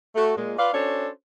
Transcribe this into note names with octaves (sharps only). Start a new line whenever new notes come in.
A3 F#4 A4
A#2 G#3
F4 B4 D5 F5
C#4 D4 F#4 A4 C5 C#5